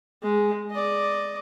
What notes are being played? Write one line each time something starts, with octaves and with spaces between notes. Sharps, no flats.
G#3
D5 D#5